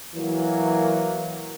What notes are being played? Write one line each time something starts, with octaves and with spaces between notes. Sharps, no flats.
E3 F#3 A#3